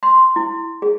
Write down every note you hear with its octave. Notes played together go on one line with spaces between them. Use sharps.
C6
E4
G#4